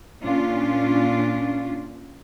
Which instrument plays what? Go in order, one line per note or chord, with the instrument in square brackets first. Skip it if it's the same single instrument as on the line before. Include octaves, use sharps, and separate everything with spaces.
[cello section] A#2 C#4 D4 F4